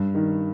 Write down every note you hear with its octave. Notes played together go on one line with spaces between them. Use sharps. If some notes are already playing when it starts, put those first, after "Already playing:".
Already playing: G2
D#3